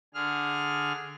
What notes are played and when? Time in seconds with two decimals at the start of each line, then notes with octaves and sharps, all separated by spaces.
0.14 D3 G#4 F6